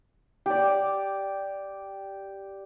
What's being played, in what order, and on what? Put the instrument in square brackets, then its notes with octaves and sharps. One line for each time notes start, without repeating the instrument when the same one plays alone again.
[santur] G4 D5